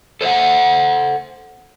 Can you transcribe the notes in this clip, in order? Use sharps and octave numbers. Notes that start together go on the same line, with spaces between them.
A4 C5 D5 E5 F#5